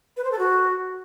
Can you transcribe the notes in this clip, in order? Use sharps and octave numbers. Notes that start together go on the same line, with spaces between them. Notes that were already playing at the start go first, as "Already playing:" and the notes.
B4
C5
A4
F#4